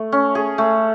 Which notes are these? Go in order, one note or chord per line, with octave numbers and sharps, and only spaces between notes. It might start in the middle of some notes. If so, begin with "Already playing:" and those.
Already playing: A3
C#4
G#4
A3